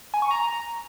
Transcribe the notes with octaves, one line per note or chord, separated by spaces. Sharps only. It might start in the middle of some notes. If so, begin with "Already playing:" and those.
G#5
C#6
A#5